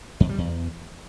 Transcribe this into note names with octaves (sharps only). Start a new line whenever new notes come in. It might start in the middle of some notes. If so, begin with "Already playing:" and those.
F2
G3
E2